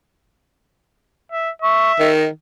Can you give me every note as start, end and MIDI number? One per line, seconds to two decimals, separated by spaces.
1.32 1.51 76
1.62 2.10 76
1.62 1.92 85
1.99 2.26 51
1.99 2.23 75